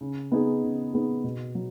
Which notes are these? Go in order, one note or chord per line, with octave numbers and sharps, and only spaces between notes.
C#3
B3 D#4 G#4
C#3
B3 D#4 G#4
B2
F#3